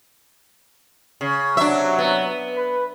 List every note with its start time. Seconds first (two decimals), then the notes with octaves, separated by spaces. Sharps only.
1.21 C#3
1.57 C3 F#3 D4 E5
1.98 B3
2.56 B4